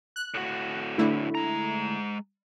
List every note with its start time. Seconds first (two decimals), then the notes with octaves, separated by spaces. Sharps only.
0.16 F#6
0.34 A2 F#4
0.98 D3 A3 E4
1.35 G#3 A#5